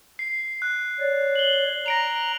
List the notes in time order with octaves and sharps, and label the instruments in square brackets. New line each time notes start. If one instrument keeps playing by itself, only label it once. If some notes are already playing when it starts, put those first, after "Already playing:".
[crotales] C7
F#6
[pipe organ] C#5 D5
[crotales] F#7 G7
[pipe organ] A#5 [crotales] A#6 D7 F7